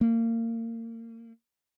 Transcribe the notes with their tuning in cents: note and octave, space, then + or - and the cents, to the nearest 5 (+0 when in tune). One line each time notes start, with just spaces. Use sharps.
A#3 -30